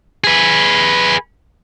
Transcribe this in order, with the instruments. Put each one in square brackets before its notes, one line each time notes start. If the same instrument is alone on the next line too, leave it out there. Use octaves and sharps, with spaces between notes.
[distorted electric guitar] G#4 B4